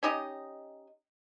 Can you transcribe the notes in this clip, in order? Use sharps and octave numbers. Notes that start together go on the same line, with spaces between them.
C#4 D#4 G4 D#5